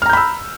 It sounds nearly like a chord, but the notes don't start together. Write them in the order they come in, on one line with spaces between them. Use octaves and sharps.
F6 A#5 G6 B5 E6